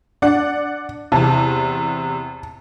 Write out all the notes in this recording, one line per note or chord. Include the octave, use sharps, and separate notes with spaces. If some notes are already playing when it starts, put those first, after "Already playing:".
D4 D5 F#5
E2 C3 A5